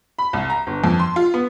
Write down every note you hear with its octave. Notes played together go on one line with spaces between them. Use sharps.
B5
C2
A#5
G1
F2
C6
F4
B3